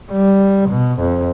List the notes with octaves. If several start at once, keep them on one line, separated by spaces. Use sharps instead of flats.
G3
B2
F2